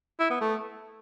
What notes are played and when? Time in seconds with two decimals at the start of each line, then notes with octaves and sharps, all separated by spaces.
0.19 E4
0.30 B3
0.41 A3